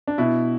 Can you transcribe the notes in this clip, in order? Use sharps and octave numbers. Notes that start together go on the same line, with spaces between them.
D4
B2 E4